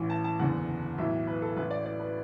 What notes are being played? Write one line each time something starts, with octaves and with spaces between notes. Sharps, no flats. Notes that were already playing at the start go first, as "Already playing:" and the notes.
Already playing: A1 A2 E3
A5
A5
F#1 E2 D3 F#5
B1 A2 E3 E5
B4
A4
A1 A2 E3 B4
D5
D5
B4